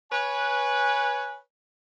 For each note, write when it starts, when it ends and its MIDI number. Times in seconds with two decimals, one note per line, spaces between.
0.12 1.38 71
0.12 1.38 73
0.12 1.38 80